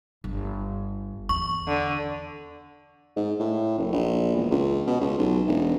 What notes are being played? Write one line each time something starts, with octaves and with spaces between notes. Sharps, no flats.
G1
E2 C#6
D3
G#2
A2
F#1
A#1
E1
C#2
B2
C#2
B1
E1